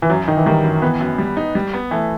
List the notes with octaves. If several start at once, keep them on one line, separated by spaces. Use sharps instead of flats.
E3
F#2 F#3
D#3 D#4
E3
D#3 G3
F#2
E3 B3
F#2
G3
D#4
G3
B3
E3 A3